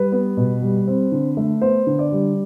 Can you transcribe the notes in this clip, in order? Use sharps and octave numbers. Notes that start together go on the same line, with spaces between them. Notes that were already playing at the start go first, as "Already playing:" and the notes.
Already playing: G3 B4
B3
B2
G3
C4
D3
A3
B3 C5
D3
D5
G3